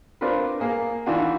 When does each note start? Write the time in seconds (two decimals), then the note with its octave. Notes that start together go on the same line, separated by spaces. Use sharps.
0.21 C4 D4 F4 A#4 B4
0.60 A#3 G#4
1.06 D#3 E3 D4 F4 F#4